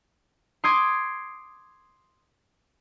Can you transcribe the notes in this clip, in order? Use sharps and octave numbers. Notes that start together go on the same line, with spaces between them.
C6 D6 D#6 G#6